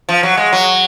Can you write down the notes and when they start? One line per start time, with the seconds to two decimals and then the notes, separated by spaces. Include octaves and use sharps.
0.09 F3
0.23 F#3
0.37 G#3
0.53 F#3